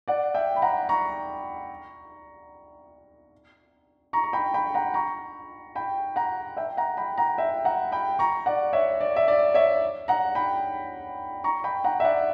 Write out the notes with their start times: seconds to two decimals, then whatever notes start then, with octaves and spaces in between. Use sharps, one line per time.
0.08 D5 F#5
0.34 E5 G5
0.56 B5
0.62 F#5 A#5
0.89 A#5 C#6
4.13 A#5 C#6
4.24 A#5
4.33 G5 B5
4.54 G5 B5
4.74 F#5 A#5
4.94 A#5 C#6
5.75 G5 B5
6.16 F#5 A#5
6.57 E5 G5
6.77 F#5 A#5
6.97 G5 B5
7.18 F#5 A#5
7.38 E5 G5
7.65 F#5 A#5
7.92 G5 B5
8.19 A#5 C#6
8.46 D5 F#5
8.73 C#5 E5
9.01 D5
9.16 E5
9.28 D5
9.54 C#5 E5
10.08 F#5 A#5
10.35 G5 B5
11.44 A#5 C#6
11.64 G5 B5
11.84 F#5 A#5
12.00 E5
12.04 D5 F#5